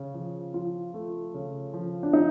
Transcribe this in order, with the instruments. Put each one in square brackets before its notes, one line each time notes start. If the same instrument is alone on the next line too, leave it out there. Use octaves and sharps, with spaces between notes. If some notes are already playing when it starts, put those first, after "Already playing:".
Already playing: [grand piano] C#3
F3
[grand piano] F3 [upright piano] F4
[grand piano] A3
C#3
F3
[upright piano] D4
[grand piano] F3 [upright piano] D#4